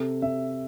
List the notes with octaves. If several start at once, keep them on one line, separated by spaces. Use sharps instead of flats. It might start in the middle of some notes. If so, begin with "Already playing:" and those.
Already playing: C3 A4
C3 E5